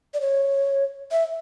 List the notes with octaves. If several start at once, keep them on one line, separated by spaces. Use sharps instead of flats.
D5
C#5
E5